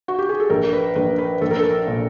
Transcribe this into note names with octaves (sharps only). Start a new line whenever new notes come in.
F#4
G4
G#4
A4
A#1 A#4
B4
A#1 B4
B4
A#1 A4
A#4
A4
A#2